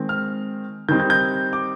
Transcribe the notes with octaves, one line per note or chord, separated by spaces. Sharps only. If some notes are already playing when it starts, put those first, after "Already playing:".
Already playing: D#3 G#3 C4
F6
D#3 G3 C4 D#4 G6
G6
G6
D6